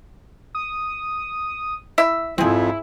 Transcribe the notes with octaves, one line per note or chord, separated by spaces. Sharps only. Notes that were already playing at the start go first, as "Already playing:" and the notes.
D#6
E4 E5
F2 G#2 F3 C4 E4 G#4